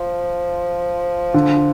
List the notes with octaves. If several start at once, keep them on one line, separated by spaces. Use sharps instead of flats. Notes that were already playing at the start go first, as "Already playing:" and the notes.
Already playing: F3
D3